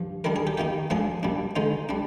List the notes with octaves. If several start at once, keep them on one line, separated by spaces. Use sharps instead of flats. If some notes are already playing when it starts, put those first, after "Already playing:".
Already playing: G2 F3
D#3 G3 D4 A#4
G#4
G4
D#3 A#3 D#4 G4
G#2 F3 G#3 D4 G#4
A#2 G3 D4
D3 G#3 D#4 C5
G3 D4